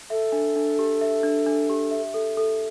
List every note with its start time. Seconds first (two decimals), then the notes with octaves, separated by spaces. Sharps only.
0.10 A4 E5
0.32 D4
0.56 D4
0.79 G4
1.01 E5
1.23 D4
1.46 D4
1.69 G4
1.91 E5
2.14 A4
2.37 A4